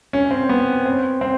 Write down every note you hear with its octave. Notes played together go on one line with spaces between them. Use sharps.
C#4
C4
B3
C4
C4